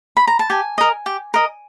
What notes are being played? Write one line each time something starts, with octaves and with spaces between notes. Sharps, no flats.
B5
A#5
A5
G4 G#5
A#4 D#5
G4
A#4 D#5